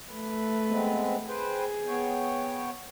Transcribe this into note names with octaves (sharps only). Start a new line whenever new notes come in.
A3 B4
G#3 B3 C4
G#4 B4 C5 G5
B3 C#5 G5